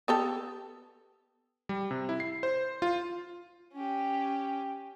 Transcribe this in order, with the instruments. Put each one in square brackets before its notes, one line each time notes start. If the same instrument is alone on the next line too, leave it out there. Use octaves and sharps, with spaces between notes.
[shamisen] B3 G4 A4
[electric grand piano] G3
C3
E4
C7
C5
F4
[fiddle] C#4 G4